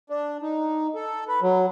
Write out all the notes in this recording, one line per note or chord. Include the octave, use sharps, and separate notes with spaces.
D4
D#4
A4
B4
F#3